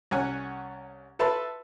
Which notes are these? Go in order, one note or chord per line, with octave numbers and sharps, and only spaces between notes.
C2 C#4 C#5 F#5 G#5
A4 B4 E5 A5 B5 C6